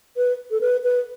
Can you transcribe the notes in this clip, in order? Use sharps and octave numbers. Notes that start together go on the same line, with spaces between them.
B4
A4
B4
B4